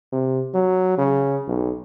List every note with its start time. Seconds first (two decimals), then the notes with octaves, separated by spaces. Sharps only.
0.13 C3
0.54 F#3
0.98 C#3
1.47 B1